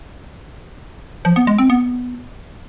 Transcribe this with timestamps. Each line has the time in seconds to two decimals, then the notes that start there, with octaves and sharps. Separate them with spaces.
1.25 F3
1.36 B3
1.47 G#3
1.58 C4
1.70 B3